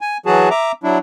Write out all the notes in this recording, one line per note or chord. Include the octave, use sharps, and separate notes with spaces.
G#5
E3 F#3 F#4 G#4 A5
E5 A#5 D6
F#3 D4 E4